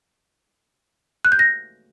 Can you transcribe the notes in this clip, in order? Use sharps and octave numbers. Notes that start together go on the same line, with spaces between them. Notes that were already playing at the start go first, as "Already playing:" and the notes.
F#6
G6
A#6